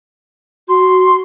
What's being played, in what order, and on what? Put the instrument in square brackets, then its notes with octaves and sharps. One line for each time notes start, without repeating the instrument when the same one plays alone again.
[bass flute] F#4 [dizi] C6